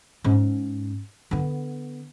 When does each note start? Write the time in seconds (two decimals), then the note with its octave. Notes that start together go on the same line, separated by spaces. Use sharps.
0.24 G#2 C#4
1.31 D3 B3